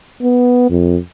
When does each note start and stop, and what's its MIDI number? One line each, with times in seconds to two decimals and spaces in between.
0.22 0.66 59
0.70 0.97 41